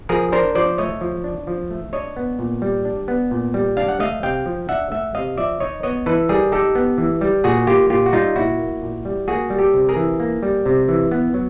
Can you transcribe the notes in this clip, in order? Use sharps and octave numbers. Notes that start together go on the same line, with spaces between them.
F3 G#4 A#4
D4 A#4 C5
F3 C5 D5
A3 C#5 D#5
F3
D4
F3
A3
D4 C#5 D#5
B3
A#2
G3
D4
B3
A#2
G3
D4 F5
F#5
A3 D#5 F5
C3 F5 G5
F3
D4 E5 F#5
A3 E5 F#5
C3 D#5 F5
F3 D5 E5
D#4 C#5 D#5
B3 C#5 D#5
E3 A4 B4
G3 G#4 A#4
D#4 G4 A4
B3
E3
G3
A#2 F#4 G#4
A#3 F4 G4
A#2 F4 G4
F#4
G3 D#4 F4
A#2 E4 F#4
A#3
A#2
G3
A#3 F#4 G#4
G3
G4 A4
C3
G#4 A#4
E3
A#3
G3
C3
E3
B3
F#3